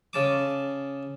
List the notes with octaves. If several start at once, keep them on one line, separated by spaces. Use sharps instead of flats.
C#3 A5 D6